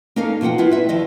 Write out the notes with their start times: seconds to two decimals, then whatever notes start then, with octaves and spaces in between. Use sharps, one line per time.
0.16 A#3 C#4 D#4 A4 A#4 F5
0.41 B2 F3 F4 F#5 G5
0.58 B3 E4 F4
0.71 B4 E5
0.89 D#2 F3 D#5